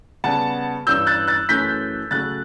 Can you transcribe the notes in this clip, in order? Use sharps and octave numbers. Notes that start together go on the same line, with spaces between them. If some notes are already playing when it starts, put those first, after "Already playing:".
C#3 G3 B3 F#5 A5
G2 E3 G3 C#4 E6 G6
F#6 A6
F#6 A6
F#2 E3 A3 C#4 G6 B6
C#3 F#3 A3 F#6 A6